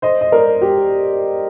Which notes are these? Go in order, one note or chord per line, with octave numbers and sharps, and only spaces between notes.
C5 D#5
D#5
A#4 D5
G4